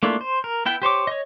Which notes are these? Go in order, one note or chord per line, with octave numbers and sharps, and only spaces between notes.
A3 A#3 D4 E4 F4
C5
A#4
B3 E4 G5
G4 C5 C#5 D6
C#5 D#5